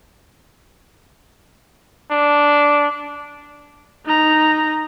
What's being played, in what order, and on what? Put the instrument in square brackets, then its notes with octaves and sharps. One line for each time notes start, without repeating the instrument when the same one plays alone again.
[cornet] D4
[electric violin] D#4 A#5